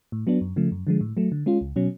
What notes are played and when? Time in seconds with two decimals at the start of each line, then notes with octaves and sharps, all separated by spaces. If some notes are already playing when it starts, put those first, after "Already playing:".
0.12 A2
0.27 F#3 B3 D4
0.41 F#2
0.56 C#3 F3 A3
0.72 F#2
0.87 D3 F3 G#3
1.01 A2
1.17 F#3 A3
1.32 D3
1.46 G#3 C#4 F4
1.61 C#2
1.76 B2 F#3 C#4